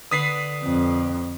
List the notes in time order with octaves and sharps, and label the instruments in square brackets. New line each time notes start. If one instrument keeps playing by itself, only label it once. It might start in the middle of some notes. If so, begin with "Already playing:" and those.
[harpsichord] D3 B3 [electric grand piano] D#6 B6 C7
[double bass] F2